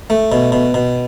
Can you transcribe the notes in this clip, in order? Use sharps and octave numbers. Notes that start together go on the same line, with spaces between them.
A3
B2
B2
B2